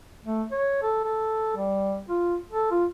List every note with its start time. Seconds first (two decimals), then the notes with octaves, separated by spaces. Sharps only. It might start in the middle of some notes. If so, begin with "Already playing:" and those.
0.24 A3
0.52 C#5
0.82 A4
1.04 A4
1.56 G3
2.09 F4
2.51 A4
2.71 F4